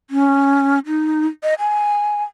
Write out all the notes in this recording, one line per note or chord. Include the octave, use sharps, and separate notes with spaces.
C#4
D#4
D#5
G#5